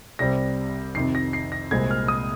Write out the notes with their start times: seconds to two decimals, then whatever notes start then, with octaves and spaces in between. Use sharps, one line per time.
0.19 C2 C3 G3 C4 A#6
0.95 F2 C3 D#3 C7
1.15 A#6
1.33 C7
1.52 A#6
1.71 C2 A#2 G#3 C4 G#6
1.91 F6
2.08 D#6